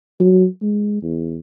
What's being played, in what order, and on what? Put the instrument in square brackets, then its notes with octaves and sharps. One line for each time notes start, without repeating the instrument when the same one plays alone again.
[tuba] F#3
G#3
E2